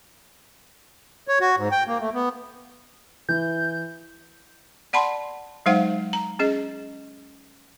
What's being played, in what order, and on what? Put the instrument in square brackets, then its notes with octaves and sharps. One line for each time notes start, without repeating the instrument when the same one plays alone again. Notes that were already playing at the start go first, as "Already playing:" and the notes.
[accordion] C#5
F#4
G#2
G5
A#3
A3
B3
[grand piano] E3 [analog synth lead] G6
[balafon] D5 F#5 A5 B5 C6
F#3 G#3 D#4 C5 F5 F#5
A#5
C#4 G#4 D#5